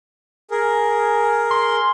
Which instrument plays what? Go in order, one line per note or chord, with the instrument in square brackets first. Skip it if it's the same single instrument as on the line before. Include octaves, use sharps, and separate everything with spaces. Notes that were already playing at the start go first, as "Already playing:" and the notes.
[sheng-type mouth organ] G#4 A#4
[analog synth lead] C6